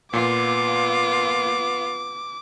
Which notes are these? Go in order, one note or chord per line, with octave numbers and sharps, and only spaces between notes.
A#2 B3 F4 D6